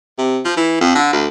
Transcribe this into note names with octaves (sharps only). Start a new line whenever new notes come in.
C3
F3
E3
F2
D3
D2